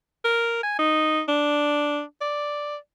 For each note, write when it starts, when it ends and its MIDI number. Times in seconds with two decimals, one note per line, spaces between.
0.25 0.59 70
0.63 0.76 80
0.79 1.22 63
1.28 2.02 62
2.21 2.76 74